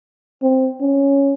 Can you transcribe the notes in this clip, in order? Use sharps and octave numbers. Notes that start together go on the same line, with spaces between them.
C4
C#4